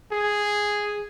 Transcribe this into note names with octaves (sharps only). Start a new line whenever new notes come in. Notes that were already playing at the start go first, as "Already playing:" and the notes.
G#4